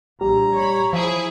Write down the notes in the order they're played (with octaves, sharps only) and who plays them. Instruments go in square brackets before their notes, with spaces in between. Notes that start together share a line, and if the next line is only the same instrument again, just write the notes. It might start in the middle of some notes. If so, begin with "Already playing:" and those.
[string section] A#1 [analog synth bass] G3 [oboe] A#5
[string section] C#5 B5
[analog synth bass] F3 [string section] E4 G#4 E5